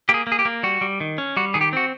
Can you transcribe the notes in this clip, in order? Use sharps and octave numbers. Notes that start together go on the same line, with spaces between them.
A#3 G4
G#4
A#3
G#4
G4
A#3
G3 F#4
G3
D#3
C#4
G3 F#4
D#3 G#4
G4
C4 F#4